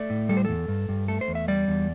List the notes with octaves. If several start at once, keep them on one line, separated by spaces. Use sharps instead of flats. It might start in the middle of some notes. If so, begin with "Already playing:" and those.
Already playing: A3 D5
A2
G3 A4
C5
E2 A4
G2
G2
A3 A4
C5
E2
E5
G3 D5
E2